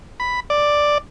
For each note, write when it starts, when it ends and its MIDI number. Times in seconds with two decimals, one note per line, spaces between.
0.20 0.40 83
0.50 0.98 74